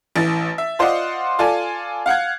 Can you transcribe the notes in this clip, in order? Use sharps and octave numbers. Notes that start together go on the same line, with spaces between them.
A1 E3 A6
E5
F4 C5 D5 D#5 F#5 C6
F4 A4 D5 G#5
F5 F#5 F#6 G#6